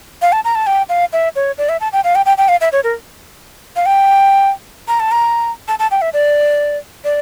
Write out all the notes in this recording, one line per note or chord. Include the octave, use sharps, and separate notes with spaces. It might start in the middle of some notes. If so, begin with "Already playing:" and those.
F5
A5
A#5
A5
G5
F5
E5
C#5
D5
E5
A5
G5
F5
G5
G5
G5
F5
E5
C#5
A#4
F5
G5
A#5
A5
A#5
A5
A5
G5
E5
D5
D5